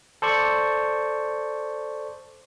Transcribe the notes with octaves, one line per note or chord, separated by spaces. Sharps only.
A4 C5 D5 C#6